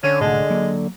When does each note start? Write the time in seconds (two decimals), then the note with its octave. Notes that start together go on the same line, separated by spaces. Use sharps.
0.03 D3 C#4
0.21 C2 A2 G#3
0.50 F#3 A#3